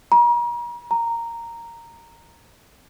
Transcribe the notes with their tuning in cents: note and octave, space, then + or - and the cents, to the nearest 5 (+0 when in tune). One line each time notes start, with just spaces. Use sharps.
A#5 +40
A#5 -5